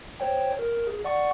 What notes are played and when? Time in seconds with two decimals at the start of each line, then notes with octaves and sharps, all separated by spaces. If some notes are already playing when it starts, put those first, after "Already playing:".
0.20 C5 C#5 G5
0.59 A#4
0.87 G#4
1.04 D5 F#5 C#6